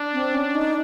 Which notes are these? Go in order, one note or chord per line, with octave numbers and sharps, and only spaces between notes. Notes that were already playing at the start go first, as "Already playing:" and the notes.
Already playing: D4
C4
C#4
D#4